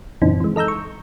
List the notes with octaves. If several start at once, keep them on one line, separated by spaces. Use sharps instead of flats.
F#2 A#2 C#3 E3 C4 D#4
E3 G#3
A4 D#5 A#5 E6 G6
C#6